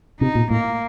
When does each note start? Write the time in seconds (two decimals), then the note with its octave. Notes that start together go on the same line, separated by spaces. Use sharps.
0.21 C3 D#4
0.35 A#2
0.50 A2 A#3